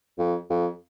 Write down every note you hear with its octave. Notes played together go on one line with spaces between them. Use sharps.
F2
F2